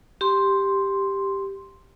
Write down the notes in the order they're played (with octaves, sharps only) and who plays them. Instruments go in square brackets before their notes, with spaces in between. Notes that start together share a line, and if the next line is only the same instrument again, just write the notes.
[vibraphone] G4 C6